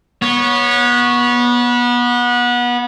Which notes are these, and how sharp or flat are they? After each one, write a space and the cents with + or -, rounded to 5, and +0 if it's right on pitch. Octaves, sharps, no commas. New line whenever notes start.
B3 -25 C#5 +0